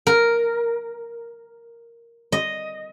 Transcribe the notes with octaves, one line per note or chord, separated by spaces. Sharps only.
A#4
D#5